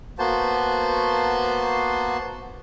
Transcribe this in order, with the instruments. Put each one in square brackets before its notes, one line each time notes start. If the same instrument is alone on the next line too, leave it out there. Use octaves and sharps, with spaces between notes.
[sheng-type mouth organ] A#3 B3 F#4 C5 A5